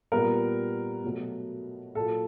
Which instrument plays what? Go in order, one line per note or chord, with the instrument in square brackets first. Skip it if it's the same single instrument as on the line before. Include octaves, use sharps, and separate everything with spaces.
[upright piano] A#2 G3 B3 A#4
B2 F#3 A3
A#2 F#3 A#3 A4